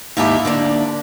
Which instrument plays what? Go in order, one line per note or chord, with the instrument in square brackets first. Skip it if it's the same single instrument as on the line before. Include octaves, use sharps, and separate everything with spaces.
[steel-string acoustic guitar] D#2 G#2 D#4 E4 G4 E5
D3 A#3 D4